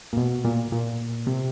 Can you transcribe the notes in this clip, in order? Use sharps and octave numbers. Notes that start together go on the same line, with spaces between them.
A#2
B2
A#2
A#2
C3